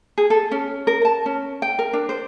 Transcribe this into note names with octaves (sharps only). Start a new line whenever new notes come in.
G#4
A4
C#4
A#4
A5
C#4
G5
A#4
D4
C5